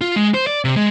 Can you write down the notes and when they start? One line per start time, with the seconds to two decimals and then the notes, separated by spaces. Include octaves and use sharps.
0.01 F4
0.16 G#3
0.34 C5
0.47 D5
0.65 C3
0.76 G#3